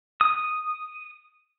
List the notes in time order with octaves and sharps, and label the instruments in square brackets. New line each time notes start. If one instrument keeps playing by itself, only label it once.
[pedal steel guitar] D#6